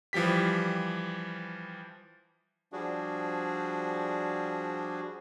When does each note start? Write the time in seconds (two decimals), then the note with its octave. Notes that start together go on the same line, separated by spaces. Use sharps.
0.13 E3 F3 G3 G4 B6
2.72 F3 G3 D4 F#4 G#4